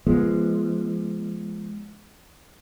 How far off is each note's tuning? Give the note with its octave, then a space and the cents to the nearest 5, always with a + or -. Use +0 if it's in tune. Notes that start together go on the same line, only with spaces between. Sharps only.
F3 -30 G#3 +5 B3 -30